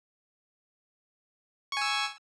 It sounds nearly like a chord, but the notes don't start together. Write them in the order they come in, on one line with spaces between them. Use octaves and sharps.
C#6 G#5 E6